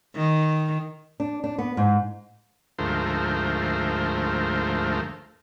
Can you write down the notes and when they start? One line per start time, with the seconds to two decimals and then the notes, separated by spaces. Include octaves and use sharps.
0.16 D#3
1.20 D4
1.44 D4
1.58 B3
1.77 G#2
2.79 D2 G#2 F3 A3 A#4 C5